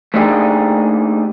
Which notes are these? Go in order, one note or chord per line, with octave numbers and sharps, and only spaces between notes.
A3 A#3 D4 D#4 G4 G#4